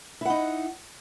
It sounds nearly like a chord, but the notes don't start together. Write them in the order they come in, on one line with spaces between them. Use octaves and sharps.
E4 F#5 D#4